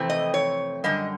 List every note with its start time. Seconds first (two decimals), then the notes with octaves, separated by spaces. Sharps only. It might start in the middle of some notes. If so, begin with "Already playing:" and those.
Already playing: F2 C3 E3 A3 C4
0.10 D#5
0.34 C#5
0.84 F#2 D3 G3 D#5